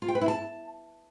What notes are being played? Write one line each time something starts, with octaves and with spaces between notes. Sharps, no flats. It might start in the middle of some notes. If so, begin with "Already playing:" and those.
F4
G5
B4
E4
A5